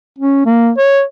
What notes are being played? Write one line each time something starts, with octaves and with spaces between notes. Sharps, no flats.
C#4
A#3
C#5